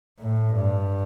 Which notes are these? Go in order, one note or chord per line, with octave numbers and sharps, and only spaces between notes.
A2
G2